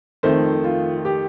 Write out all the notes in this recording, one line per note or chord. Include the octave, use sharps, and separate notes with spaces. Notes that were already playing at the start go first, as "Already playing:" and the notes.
F2 D#3 A3 C5
F4
G4